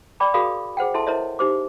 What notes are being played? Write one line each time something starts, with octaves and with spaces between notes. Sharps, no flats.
D5 G5 B5 D6
F#4 G#4 A#4 F5 B5 D#6
G#4 C5 F#5 G5
E4 A4 E5 A5 C6
E4 A#4 C5 C#5 D#5 E5
D#4 G4 C5 D6